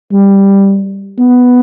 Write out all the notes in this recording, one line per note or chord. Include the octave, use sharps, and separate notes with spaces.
G3
B3